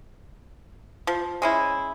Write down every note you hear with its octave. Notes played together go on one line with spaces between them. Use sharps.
F3
G#3 C#4 E4